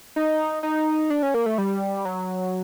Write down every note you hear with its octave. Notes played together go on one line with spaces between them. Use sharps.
D#4
D#4
D4
C#4
A#3
A3
G3
F#3